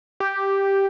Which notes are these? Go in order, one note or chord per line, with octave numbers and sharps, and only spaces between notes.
G4